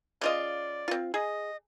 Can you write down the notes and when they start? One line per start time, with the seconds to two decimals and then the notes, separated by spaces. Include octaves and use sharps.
0.21 C#3 F4 D5 D#5
0.88 C4 F4
1.14 G#4 D#5